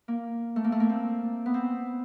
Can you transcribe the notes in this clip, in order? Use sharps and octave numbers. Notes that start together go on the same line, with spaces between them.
A#3
A3
A#3
A3
A#3
C4
B3
C4